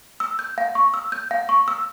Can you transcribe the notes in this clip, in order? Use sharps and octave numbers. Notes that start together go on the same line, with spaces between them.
E6
G6
F5
C#6
E6
G6
F5
C#6
E6